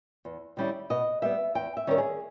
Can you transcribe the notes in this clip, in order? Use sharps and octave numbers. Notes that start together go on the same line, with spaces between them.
E2
D#3 G3 C#4 E4
B2 D#5
G3 B3 E5
E2 G5
E5
D#3 G3 C#4 E4 A#4
G#4